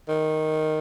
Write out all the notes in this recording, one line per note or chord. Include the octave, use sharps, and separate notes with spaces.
D#3